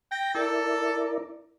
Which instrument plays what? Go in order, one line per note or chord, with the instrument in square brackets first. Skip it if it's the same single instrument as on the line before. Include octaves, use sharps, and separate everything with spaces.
[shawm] G5 [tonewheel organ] A#6
[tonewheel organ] E4 A#4 D5 [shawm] A4